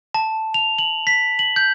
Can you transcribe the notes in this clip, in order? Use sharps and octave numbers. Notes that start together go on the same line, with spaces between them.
A5
F7
F#7
B6
F#7
G6